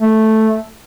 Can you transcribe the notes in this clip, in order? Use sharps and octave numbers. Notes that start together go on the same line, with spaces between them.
A3